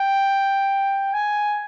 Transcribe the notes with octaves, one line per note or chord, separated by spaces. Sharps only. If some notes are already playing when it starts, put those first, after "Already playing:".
Already playing: G5
G#5